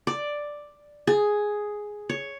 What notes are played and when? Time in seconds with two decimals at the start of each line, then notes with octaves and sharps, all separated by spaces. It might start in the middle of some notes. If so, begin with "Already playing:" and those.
0.07 D5
1.07 G#4
2.09 C#5